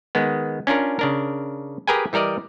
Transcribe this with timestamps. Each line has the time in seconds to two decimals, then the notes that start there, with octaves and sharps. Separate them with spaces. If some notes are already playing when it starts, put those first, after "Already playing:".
0.15 D#3 G#3 B3
0.67 C#4 D4 F4 A#4
0.99 C#3 D4 A#4
1.88 G4 G#4 A#4 B4 G5 G#5
2.13 E3 G3 A#4 D5 D#5